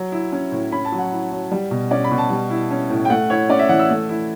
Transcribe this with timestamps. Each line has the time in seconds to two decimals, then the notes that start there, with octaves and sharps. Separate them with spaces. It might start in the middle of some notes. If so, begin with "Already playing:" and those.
Already playing: F#3
0.12 E4
0.32 C#4
0.52 A2
0.72 C#4 B5
0.85 A5
0.92 F#3
0.98 F#5
1.12 E4
1.32 F#3
1.51 G3
1.71 B2
1.91 C#4 D5
2.04 B5
2.11 B2
2.18 A5
2.30 G3
2.50 E4
2.71 C#4
2.90 A2
3.05 G5
3.10 A3 F#5
3.30 E4 C#5
3.49 C#4 D5
3.59 E5
3.69 E3 F#5
3.79 E6
3.89 A3
4.09 E4